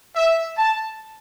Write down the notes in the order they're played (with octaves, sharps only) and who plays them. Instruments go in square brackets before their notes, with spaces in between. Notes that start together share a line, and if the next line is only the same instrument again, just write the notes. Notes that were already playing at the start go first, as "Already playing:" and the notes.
[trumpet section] E5
A5